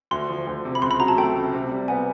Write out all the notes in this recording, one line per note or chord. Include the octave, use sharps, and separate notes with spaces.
D2 C6
F3
D2
C3
B5
C#2 C6
B5
F#3 A#5
A5
A3 G5
C#3
C3
G3
B3 G#5